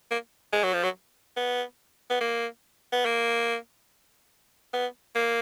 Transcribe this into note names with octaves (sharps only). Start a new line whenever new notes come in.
A#3
G#3
F#3
F3
F#3
B3
B3
A#3
B3
A#3
B3
A#3